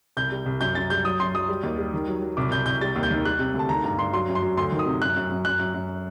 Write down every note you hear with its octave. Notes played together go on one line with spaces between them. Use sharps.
C2 G6
G3
C2
F#2 G6
F#2 A6
G3 G6
F#3 D#6
F#2 C6
F#3 D#6
G3
D#2
G3
D#3
F#3
F#3
C2 D6
C2 G6
C2 G6
G3 A6
D#2
G6
D#3
G3 F#6
C3
D2
A5
D#3 A#5
G2 A#5
G2 C6
F#3 C6
F#2
C6
F#3
D2 C6
D#3
D#6
C3
F#2 F#6
F#2
F#2
F#2 F#6
F#2
F#2